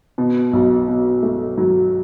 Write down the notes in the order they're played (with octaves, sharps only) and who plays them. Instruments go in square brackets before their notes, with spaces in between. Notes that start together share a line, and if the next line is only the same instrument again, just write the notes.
[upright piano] B2
B1
B2
A3
F#3